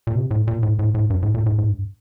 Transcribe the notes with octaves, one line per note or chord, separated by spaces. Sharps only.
A#2
C3
A2
A#2
A2
A2
A2
G2
A2
A#2
A2
A2
G2